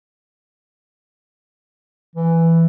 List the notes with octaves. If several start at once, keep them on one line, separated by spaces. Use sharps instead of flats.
E3